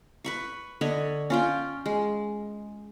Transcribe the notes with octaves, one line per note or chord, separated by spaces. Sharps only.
B4 B5 C#6
D3 C#5 D#5 B5
C#4 F4 G5
G#3